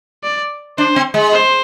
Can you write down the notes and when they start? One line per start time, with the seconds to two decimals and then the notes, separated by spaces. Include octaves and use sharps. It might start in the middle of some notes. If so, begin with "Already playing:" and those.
0.23 D5
0.78 D4 C5
0.96 C4
1.14 G#3
1.33 C5